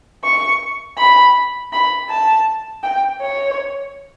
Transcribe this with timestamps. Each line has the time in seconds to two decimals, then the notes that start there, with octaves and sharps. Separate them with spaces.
0.24 C#6
0.98 B5
1.73 B5
2.10 A5
2.83 G5
3.21 C#5